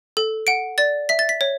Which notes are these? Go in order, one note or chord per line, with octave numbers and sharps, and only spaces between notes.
A4
F#5 D7
D5 A6
E5 B6
A6
B6
C#5